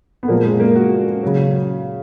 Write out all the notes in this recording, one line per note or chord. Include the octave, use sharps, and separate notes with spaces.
B3
A#2 F3 G#3 A#3
G#3
A#3
F#4
C#3 F#3